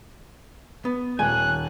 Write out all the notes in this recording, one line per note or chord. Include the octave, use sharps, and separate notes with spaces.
B3
D#1 G#5 F#6